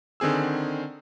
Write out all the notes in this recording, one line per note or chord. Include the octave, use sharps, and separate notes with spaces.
D3 D#3 C4 G#4 E6